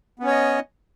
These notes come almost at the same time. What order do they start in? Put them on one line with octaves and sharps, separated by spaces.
B3 C#4 C#5 D#5